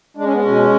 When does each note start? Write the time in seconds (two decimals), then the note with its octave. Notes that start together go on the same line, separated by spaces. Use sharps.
0.17 G#3 D4
0.25 C#4
0.33 B3
0.40 B2 C#4